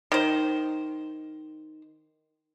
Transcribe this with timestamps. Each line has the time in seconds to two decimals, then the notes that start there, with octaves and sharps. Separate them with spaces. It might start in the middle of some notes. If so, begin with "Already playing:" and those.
0.12 D#3 C5